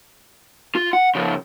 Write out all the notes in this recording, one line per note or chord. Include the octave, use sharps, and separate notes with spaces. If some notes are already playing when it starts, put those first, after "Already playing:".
F4
F#5
C#3 F3